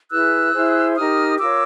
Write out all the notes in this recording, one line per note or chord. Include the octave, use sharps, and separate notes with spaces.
E4 G#4 B4 E6 F#6
E4 G#4 C5
D#4 G4 A#4 D#6 F6
F4 A#4 C#5 D6 E6